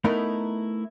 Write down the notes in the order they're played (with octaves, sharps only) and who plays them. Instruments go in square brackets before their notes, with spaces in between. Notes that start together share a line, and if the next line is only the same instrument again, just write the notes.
[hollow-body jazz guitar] A3 B3 D#4 E4 A#4